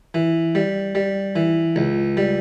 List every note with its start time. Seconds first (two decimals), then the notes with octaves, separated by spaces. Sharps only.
0.14 E3
0.55 G3
0.95 G3
1.36 E3
1.76 C#2
2.17 G3